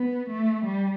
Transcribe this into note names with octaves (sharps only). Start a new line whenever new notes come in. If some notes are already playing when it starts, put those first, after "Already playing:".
Already playing: B3
A3
G3